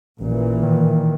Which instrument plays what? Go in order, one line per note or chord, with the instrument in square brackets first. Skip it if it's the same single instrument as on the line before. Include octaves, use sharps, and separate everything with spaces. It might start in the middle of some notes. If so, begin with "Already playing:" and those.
[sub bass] A1 [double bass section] A#2 E3
[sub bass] D#3